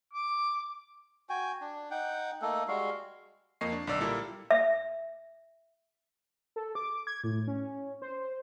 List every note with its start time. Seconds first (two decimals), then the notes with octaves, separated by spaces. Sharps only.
0.13 D6
1.29 F#4 G5 G#5
1.61 D4
1.91 D#4 F#5 G5
2.42 A3 A#3 D#4 A4
2.68 G3 G#3 F#4 F5
3.61 F2 A#3 D#5 C#6 C7
3.72 D4
3.87 B1 D3 D5 E6
4.00 A#2 G3 E4 A4 A#4
4.51 E5
6.56 A4
6.75 D6
7.07 G#6
7.24 A2
7.47 C#4
8.02 C5